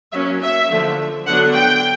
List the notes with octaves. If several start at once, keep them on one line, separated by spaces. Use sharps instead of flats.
F#3 A#3 C#4 E5
E5
D3 F3 A3
D3 F#3 B3 D4 F#5
G5